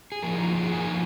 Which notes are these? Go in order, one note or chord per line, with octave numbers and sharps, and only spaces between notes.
G#4
F2 F3 A#3 D#4 A#4
F4
G#4
F2 F3 A#3 D#4 G#5